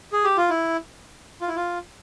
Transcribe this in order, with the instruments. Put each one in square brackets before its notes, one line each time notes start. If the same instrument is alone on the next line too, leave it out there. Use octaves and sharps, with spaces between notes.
[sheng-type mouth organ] G#4
G4
F4
E4
F4
E4
F4